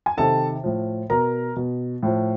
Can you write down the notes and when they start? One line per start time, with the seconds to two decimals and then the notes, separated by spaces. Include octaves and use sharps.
0.06 G#5
0.17 C3 D#3 A4 A5
0.64 A2 F3
1.10 B2 A#4 A#5
1.56 B2
2.03 A2 F3